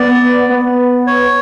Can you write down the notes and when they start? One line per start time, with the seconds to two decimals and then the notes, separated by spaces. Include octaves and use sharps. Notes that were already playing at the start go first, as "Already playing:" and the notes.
Already playing: B3 D5
0.49 B3
1.07 C#5